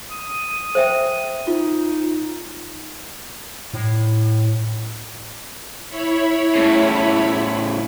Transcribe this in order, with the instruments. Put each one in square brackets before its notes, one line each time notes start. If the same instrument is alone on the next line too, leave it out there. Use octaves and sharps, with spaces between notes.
[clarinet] D#6
[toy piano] C5 E5 G5
[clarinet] D#4 [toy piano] F4
[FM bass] A2
[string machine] E4 C#5 B5
[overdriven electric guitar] A2 C#3